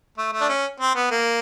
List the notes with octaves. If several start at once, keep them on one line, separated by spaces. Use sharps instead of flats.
A3
A3
D4
C#4
C4
B3
A#3